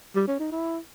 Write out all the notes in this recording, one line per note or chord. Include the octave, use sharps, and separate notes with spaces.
G3
C#4
D#4
E4